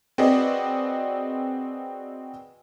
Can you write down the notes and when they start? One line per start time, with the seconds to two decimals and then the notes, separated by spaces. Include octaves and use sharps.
0.18 C4 F#4 G#4 B4 D5 D#5